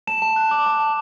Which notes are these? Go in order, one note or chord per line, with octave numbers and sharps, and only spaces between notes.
A5 E7
A5
F#6
D6
A5
A5